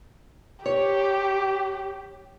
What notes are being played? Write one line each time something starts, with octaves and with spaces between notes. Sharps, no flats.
G4 C#5